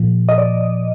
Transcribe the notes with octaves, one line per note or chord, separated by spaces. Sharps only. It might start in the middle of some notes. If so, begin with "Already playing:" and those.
Already playing: A#2 F3
D#5
D5